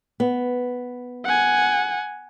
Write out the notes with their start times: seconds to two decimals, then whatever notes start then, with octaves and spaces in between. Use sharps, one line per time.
0.20 B3
1.25 F#5 G#5